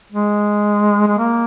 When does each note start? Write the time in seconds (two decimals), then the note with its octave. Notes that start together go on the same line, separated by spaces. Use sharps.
0.12 G#3
1.07 G#3
1.18 A#3